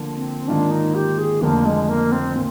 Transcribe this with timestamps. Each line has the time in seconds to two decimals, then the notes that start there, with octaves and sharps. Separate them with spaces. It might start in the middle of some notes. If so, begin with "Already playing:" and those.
Already playing: D3 F3 A#3
0.16 C4
0.48 G#2 D#3 A#3 D4 F4
0.71 D#4
0.94 G4
1.18 G#4
1.42 F1 F2 D3 F3 A#3
1.65 G#3
1.89 A#3
2.12 C4
2.35 A#2